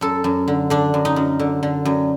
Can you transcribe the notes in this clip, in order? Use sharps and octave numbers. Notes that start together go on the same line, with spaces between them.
F#2 A4
F#2
D3
D3 D4
F#2
D#4
F#2
D3
D3
F#2